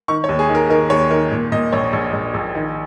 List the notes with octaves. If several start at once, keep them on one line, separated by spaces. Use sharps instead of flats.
D#3 C#6
C#5
D#2
G#4
D#3
A#4
D#3 A#4
D#2 C#5
D#3 A#4
A#2
A#2 D#5
A#1 C#5
A#1
A#1
A#1
D#3